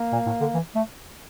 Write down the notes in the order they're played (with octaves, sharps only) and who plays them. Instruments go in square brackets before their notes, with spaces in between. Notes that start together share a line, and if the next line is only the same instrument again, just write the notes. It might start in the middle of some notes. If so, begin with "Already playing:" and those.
Already playing: [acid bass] A#3
[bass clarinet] A#2
A2
D3
E3
A3